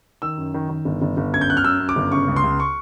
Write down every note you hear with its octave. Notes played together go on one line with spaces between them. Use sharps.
D#3 E6
F#2
D#3
D#3
G1
G1
G1
F#2 G#6
G6
F#2 F#6
F6
F#2 E6
F#2
D6
G1
C#3 C#6
C#2
C6
C#2
C#6